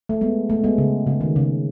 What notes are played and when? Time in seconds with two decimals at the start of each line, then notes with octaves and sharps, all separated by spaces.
0.09 A3
0.21 G#3 B3
0.50 A3
0.64 G#3 B3
0.78 C#3
1.07 C#3
1.21 D#3
1.36 C#3